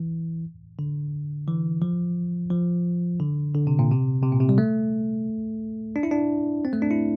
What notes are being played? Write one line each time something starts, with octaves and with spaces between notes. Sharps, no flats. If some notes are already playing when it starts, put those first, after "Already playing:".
Already playing: E3
D3
E3
F3
F3
D3
D3
C3
A#2
C3
C3
A#2
C3
G3
A3
D4
E4
D4
C4
A3
D4
E4